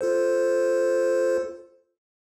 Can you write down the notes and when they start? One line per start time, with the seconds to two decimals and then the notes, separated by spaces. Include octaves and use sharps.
0.01 F4 A4 C5